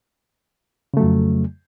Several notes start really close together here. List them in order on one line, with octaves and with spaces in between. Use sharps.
C#3 A3 F#3 F2